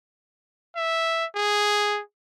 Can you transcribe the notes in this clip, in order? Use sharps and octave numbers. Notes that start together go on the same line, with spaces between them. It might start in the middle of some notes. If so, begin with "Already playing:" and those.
E5
G#4